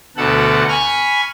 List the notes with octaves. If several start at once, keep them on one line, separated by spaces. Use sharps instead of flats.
D2 B2 A4 F#5
G#5 B5 C#6 F6